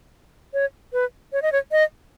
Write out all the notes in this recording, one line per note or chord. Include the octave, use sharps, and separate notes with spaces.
C#5
B4
C#5
D#5
C#5
D#5